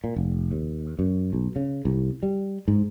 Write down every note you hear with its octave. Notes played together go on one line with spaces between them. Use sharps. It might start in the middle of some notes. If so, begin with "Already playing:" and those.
A#2
F1
D#2
F#2
B1
C#3
C2
G3
G#2